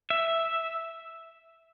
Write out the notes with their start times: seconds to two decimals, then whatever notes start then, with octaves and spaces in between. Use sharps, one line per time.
0.10 E5